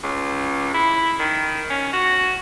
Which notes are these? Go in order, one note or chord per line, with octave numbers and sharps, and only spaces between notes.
C#2
E4
D#3
C#4
F#4